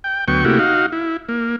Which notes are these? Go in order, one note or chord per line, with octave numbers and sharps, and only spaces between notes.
G5
D2 F#3 B3 G5 C#6
C3 A3 A#3 E4 F#4 G4
D#4 F#4 F5
E4
A#3